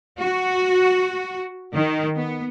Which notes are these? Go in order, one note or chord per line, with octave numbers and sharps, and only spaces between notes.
F#4
D#3
B3